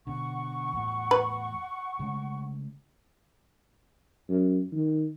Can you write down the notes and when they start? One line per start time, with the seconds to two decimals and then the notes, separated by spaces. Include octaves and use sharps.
0.07 B2 D3 F#5 C#6
0.73 E2 A2
1.11 B4
1.99 C#3 G#3 A3
4.29 F#2
4.73 D#3